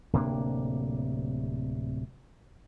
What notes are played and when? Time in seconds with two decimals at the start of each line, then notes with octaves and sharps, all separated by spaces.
0.13 D1 C3 A#3 D4